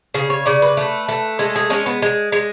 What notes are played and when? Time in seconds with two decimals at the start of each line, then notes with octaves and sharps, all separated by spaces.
0.14 C#3 G#4
0.30 C#5
0.46 C#3 D5
0.62 B4
0.77 A3
1.09 A3
1.39 G#3 A4
1.56 G#4
1.70 G#3 C#4
1.86 B3
2.02 G#3
2.32 G#3